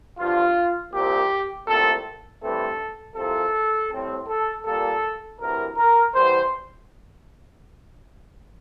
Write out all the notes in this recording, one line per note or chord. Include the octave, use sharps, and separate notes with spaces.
G2 D3 F3 F4
C2 A#2 F3 C4 G4
C2 A#2 A3 C4 A4
G2 E3 A3 C4 A4
C2 C3 F3 A4
A2 G3 C4
A4
A#2 G3 A#3 A4
D2 C3 E3 A#4
A#4
E2 E3 G3 C5